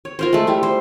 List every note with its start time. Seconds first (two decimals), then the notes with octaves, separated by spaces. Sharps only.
0.05 C#5
0.19 F4 A#4 C5
0.33 G#3 A3
0.47 G3 A3 E4
0.63 C5